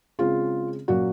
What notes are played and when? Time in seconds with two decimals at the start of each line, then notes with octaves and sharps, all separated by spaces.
0.19 C#3 G#3 C4 F4
0.88 A#2 F#3 A#3 C#4 F#4